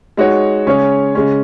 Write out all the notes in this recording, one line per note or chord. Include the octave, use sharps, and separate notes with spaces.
G#3 D#4 F#4 C#5
C#3 G#3 C#4 G#4 C#5
C#3 G#3 C#4